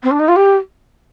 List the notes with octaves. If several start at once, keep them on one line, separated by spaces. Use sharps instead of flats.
C4
D4
D#4
F4
G4